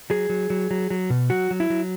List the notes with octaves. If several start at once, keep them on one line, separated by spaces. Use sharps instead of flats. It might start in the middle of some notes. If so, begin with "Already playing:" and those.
F#3 G#4
F#3
F#3
F#3
F#3
B2
F#3 F#4
F#3
E4
F#3